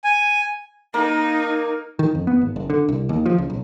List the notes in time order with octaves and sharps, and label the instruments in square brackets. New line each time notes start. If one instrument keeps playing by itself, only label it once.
[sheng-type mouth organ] G#5
[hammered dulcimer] A#3 [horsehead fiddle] D#4
[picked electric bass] D#3
F2
B3
G#1
F#1
D3
C2
D#2
F3
C#2
B1